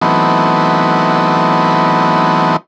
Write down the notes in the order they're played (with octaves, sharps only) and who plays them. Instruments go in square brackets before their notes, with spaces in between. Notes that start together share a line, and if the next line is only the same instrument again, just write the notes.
[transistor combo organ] E3 F#3 A3 B3 C4 D#4